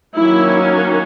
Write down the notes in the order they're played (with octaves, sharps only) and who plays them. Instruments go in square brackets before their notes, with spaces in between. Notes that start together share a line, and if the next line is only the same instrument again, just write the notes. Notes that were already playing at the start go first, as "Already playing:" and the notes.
[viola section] D#3 F#3 A#3 C#4 E4